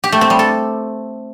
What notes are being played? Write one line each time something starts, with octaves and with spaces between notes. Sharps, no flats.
G4
A3
C4
G3
A4